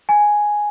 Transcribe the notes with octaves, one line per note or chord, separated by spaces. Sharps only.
G#5